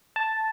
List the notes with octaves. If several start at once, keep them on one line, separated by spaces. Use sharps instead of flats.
A5